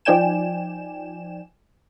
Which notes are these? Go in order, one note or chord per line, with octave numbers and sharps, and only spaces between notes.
F3 D#4 D5 G5 G#5 E7